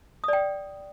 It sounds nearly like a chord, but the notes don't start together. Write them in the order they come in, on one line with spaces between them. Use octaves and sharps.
D#6 D5 G5